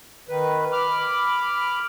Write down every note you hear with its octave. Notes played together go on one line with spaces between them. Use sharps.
D#3 B4
B5 D6 F6